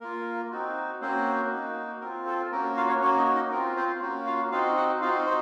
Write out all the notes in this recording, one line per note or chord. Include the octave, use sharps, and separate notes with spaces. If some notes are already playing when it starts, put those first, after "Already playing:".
A#3 F4 A#4
C4 D#4 F#4
A#3 C4 C#4 F#4 C5
A#3 D#4 F#4
C4 F4 A#4
A4
A#3 C#4 F#4 A#4
F4 F5
C#4 C#5
A#3 C#4 F#4 C#5
D#4 D#5
D#4 D#5
C4 F4 A#4
C4 C5
A#3 C#4 F#4
F4 F5
C4 D#4 F4 F#4 F5
F#4 F#5
C4 D#4 F4 F#4 F5
C5